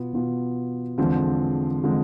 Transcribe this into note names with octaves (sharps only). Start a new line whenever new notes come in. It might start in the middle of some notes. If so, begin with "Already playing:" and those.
Already playing: B2 B3 F4
B2 B3 F4
E2 D3 F3 G#3 C4
D3 F3 G#3 C4